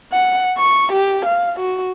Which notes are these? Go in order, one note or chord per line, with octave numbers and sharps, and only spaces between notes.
F#5
C#6
G4
F5
F#4